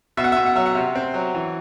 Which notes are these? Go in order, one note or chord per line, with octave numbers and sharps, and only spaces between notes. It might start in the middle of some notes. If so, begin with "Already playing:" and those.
B2 E5
F#5
B2 E5
F#5
F#3 E5
F#5
C3
C4
F#3
E3